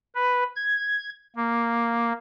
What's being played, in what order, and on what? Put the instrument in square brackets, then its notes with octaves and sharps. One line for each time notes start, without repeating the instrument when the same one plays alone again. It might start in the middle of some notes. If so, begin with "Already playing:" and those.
[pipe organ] B4
G#6
A#3